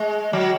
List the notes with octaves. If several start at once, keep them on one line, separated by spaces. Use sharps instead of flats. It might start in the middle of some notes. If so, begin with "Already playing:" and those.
Already playing: G#3
F#3